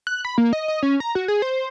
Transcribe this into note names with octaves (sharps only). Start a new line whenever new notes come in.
F#6
B5
A#3
D#5
D#5
C#4
A#5
F#4
G#4
C5